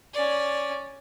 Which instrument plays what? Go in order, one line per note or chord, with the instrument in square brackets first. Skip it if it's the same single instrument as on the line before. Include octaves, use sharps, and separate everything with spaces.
[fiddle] C#4 D5